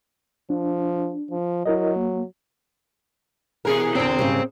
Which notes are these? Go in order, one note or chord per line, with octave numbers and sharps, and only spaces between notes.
F3 D4
F3
F#3 E4 A#4 D#5
A#3
B2 E3 G#4 A#4
E2 D3 C4 C5
G#2 C#3 G3